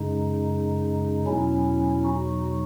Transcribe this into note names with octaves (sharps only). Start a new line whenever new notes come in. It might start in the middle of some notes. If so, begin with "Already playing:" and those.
Already playing: F#2 C#3 G#3 D#4
E2 B2 F#3 C#4 E4
D#4 F#4